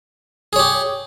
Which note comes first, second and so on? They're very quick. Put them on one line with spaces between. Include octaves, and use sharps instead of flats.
G#4 C#5 G4